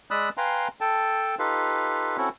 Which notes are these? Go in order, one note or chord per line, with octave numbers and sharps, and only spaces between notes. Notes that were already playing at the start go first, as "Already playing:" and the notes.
G#3 D5 B5 D#6 E6 F#6
B4 F5 G5 G#5 A#5 C6
A4 G5 A5
D#4 F4 G4 A4 B4 F5
C4 C#4 E4 F#4 A4